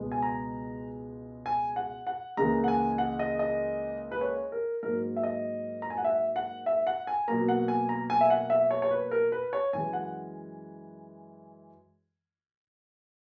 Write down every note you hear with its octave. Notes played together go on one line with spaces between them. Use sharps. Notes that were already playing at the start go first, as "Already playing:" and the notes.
Already playing: C#2 B2 G#3 B3
G#5
A#5
G#5
F#5
F#5
C#2 C#3 E3 A#3 A#5
F#5
G#5
F#5
D#5
D#5
B4
C#5
A#4
G#2 F#3 A#3 A#4
E5
D#5
A#5
G#5
F#5
E5
F#5
E5
F#5
G#5
B2 F#3 A#3 A#5
F#5
G#5
A#5
G#5
E5
F#5
E5
C#5
C#5
B4
A#4
B4
C#5
F#2 E3 G#3 G#5
F#5